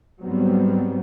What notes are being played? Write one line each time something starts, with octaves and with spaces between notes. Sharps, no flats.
G#2 F#3 G3 B3 C4